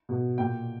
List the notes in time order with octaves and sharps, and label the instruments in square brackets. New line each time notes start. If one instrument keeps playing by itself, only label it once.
[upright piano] B2
A#2 G5